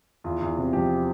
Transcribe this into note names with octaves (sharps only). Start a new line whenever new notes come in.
E2 F4
E2
C3
F3 G4